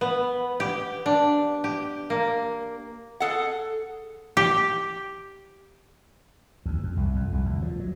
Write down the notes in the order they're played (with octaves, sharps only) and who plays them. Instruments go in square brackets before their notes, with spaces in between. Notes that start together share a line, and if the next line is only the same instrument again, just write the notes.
[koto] B3
G4
D4
G4
A#3
[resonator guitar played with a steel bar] G#4 A4 F#5
[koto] G4
[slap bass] D2
F2
C2
F2
C2
D2
F3
F#3